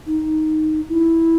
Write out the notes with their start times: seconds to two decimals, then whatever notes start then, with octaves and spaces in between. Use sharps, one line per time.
0.07 D#4
0.89 E4